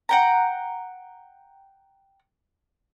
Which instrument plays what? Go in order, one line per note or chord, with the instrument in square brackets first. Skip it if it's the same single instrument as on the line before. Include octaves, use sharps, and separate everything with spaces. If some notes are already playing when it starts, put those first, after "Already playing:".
[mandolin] F#5 G5 A#5